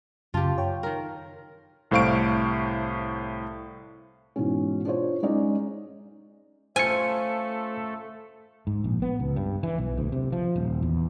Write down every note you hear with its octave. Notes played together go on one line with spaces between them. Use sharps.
F#2 C#3 F4 G4 A5
C#5 G5
D#3 A#4
C2 A2 C5 F5 C#6 D7
G#2 B2 E3 G#3 C#4
D4 F4 C5 C#5
G#3 C#4 D#4 D5
A3 C#4 F4 A4 C5 F5 G#5 C#7
G#2
A#1
B3
C#2
G2
E3
B1
D2
C3
F3
D#1
E2